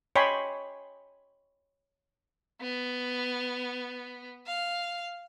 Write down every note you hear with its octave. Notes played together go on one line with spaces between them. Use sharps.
C#5 D#5 G5 G#5 B5 C6
B3
F5